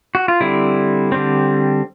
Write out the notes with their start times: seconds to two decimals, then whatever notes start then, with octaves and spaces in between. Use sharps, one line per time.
0.15 F#4
0.28 F4
0.40 D3 G3 C4 E4
1.12 D3 G3 C4